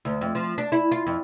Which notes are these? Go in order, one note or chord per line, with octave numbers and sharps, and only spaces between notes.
D2
F2
F3
D4
E4
F4
F2